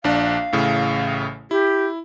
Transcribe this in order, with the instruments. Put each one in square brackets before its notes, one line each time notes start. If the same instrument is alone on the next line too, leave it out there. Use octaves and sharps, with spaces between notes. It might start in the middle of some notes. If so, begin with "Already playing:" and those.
[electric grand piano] A#1 D4 [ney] F5
[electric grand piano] A1 A2 C#3
[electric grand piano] E4 [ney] G4